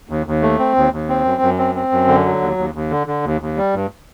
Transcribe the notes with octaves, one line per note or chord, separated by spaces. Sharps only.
D#2
D#2
A3
C4
D#2
D#2
C4
F#2
F#2
C4
C4
F#2
D3
F#3
D#2
D#2
D#2
D3
D3
D#2
D#2
G3
G2